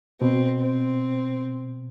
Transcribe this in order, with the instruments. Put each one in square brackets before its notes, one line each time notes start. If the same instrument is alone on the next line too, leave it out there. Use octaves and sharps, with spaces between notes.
[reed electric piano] B2 [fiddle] C4
[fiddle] C4